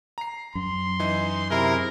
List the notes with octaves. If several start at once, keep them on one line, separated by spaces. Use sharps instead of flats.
A#5 C7
F#2 C6
E3 D#4
C3 E4 G#4 A#4